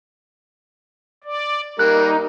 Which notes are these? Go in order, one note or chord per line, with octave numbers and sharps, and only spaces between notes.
D5
G3 A#3 D#4 F#6